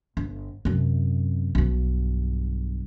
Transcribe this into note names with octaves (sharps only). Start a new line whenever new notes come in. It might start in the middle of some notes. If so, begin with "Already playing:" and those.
G1
F#2 C3
B1 G2